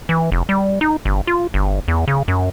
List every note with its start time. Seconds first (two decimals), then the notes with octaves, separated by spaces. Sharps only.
0.09 E3
0.32 F1
0.49 G3
0.81 D#4
1.05 G1
1.27 F4
1.54 G1
1.88 E2
2.08 C#3
2.28 F#2